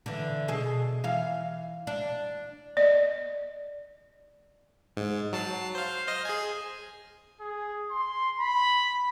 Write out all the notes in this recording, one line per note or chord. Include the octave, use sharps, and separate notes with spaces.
D3 E3
B2 G#4 A4
E3 F5
D4
D5 D#5
G#2
F#3 A5 C7
C5 F5
C5 D#5 F6
G#4 G#5
G#4
C6
B5